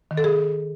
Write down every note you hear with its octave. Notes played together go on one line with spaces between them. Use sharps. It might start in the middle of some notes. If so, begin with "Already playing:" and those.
D#3
A4
G#4